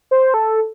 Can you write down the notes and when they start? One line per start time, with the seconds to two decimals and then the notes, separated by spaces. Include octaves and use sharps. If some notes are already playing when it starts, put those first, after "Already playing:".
0.11 C5
0.34 A4